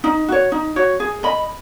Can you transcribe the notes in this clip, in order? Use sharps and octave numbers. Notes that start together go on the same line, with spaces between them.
D#4
F#4 C#5
D#4
F#4 C#5
G#4
D#5 B5